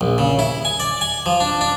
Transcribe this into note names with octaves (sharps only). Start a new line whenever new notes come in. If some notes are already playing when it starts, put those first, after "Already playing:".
A#1
C#3
E4
G#5
D5
G#5
F3
D4
D4